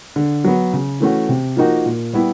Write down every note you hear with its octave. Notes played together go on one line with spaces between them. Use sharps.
D3
F#3 B3
C#3
E3 A3 C#4 F#4
C3
F3 A#3 D#4 F#4
A#2
G3 B3 E4